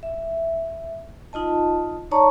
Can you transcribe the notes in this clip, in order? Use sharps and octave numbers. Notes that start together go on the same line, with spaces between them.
E5
D#4 F4 D#5 A5
D#4 C#5 D5 A5 A#5 C#6